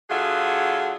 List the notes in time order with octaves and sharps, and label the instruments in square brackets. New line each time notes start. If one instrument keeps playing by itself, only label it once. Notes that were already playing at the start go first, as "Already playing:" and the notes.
[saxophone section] D3 F#3 F4 G#4 E5 F#5